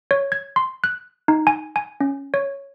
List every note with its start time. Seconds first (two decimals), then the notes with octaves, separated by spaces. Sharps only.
0.11 C#5
0.32 G#6
0.56 C6
0.84 F#6
1.28 D#4
1.47 G#5
1.76 G#5
2.00 C#4
2.34 C#5